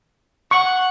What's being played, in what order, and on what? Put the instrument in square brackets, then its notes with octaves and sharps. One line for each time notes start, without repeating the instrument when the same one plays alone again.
[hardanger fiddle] F#5 [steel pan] C#6